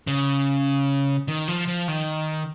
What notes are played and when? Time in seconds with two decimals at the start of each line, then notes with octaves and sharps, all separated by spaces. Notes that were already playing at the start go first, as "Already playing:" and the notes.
0.07 C#3
1.28 D#3
1.48 F3
1.68 F3
1.88 D#3